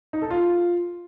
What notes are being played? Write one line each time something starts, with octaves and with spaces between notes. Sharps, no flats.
D#4
A4
F4